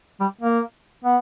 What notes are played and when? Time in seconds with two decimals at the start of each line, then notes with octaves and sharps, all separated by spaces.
0.20 G3
0.41 A#3
1.04 B3